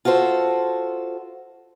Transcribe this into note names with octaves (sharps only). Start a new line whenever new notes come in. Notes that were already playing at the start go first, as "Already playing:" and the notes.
F4 F#4 A4 C5